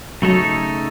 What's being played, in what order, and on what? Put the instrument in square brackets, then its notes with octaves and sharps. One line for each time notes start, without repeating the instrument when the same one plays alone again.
[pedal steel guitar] C#3 A3 D#4 A4 C#5 [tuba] F#3